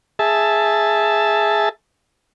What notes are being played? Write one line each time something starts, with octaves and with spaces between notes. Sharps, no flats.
G#4 E5 A5